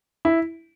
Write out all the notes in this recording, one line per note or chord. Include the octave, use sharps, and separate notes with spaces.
E4